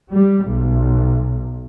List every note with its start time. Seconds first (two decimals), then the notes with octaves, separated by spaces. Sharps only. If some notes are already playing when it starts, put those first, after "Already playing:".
0.12 G3
0.47 B1